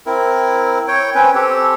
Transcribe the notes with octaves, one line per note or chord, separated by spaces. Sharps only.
C4 E4 A#4
C#5 G5
C4 C#4 B4
C4 G4 A4